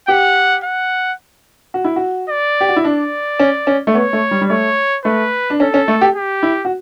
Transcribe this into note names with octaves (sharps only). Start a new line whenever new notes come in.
G4 F#5
F#5
F#4
E4
F#4
D5
G4
F#4
E4
D4 D5
C#4
C#4
A3
B3 C#5
A3
G3
G3
A3 C#5
A3 B4
D4
C#4 A4
C#4
A3
G4
G4
E4
F#4